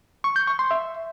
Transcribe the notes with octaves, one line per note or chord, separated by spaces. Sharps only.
C#6
G6
C#6
C6
E5